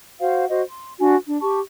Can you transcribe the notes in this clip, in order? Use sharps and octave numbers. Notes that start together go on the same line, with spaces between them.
F#4 C5 F5 F#5
F#4 C5 D#5
C6
D4 F#4 G#5
D4
G4 A5 C#6